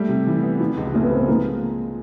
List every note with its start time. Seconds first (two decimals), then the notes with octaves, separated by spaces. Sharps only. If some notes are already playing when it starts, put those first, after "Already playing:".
Already playing: G3 A3
0.09 C3
0.27 E3
0.43 B3
0.60 F3
0.77 C#2
0.94 C#3 A3
1.03 B3
1.11 G#3 C4
1.20 B3
1.28 F3 A#3